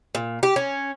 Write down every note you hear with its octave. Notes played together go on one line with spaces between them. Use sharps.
A#2
G4
C#4